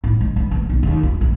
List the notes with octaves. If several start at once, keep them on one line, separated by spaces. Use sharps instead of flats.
A2
G#3
B3
A#1
B1
D#2
F4
A#1